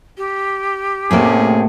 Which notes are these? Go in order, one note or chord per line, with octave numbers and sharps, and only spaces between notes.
G4
A2 C3 A3 A#3 C#4 G#4